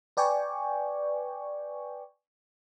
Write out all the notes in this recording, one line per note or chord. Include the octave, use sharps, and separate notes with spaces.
B4 D5 G5 G#5 C#6